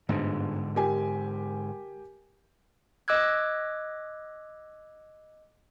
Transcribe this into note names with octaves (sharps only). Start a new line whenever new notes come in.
G1 G#2 D3 G#3
G4 A#4 G#5
D#5 D6 E6 F#6 G#6